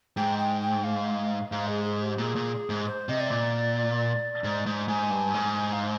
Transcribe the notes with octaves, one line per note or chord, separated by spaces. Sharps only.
G#2 G5
G5
G5
F5
G#2 F5
G#4
G#4
G4
A#2 G#4
A#2
G#2
C5
C3 D#5
D5
A#2
G#2
G#2
G#2 G#5
G2
G#2
G#5
F5